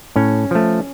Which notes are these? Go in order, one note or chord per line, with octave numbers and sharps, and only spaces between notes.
A2 C#4
F3 A3